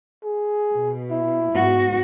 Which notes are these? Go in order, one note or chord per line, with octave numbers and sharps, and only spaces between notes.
G#4
B2
E4
G#2 B3 F#4